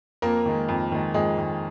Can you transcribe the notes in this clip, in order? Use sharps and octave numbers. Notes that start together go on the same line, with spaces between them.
F2 A#3 A#4
D#3 G#3
F2
D#3 G#3
F2 G#3 G#4
D#3 G#3